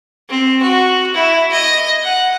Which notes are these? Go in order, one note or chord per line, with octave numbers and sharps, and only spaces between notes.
C4
F#4
E4
D#5
F#5